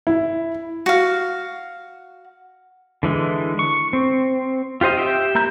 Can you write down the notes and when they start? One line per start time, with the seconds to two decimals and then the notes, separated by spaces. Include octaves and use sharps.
0.07 E4
0.86 F#4 F5
3.03 D3 E3 G#3
3.59 C#6
3.93 C4
4.81 F4 G4 C5 D#5
4.98 G4 E5 G5
5.35 A#3 E4 A#5 G6